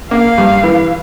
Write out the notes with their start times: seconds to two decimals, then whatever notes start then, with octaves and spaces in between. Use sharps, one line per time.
0.11 A#3 F5
0.38 G2
0.63 E3